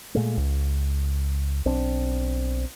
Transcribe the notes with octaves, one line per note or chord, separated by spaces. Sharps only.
A#2 G#3 A3
C#2
B1 C4 D4